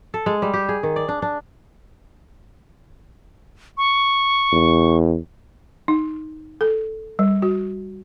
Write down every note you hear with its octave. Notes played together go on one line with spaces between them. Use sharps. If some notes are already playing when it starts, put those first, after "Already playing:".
A4
G#3
G3
G4
G#4
D#3
D5
D4
D4
C#6
E2
D#4
A4
G3
F#4